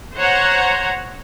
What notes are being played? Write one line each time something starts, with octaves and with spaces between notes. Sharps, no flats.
C5 C#5 F#5 A#5